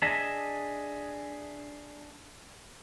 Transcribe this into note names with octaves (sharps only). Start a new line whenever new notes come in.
D4 G#4 D#5 E5